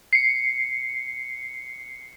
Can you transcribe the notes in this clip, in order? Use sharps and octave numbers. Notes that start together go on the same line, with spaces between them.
C7 C#7